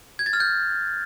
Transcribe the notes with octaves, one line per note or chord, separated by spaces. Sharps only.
G#6
A6
F6
G6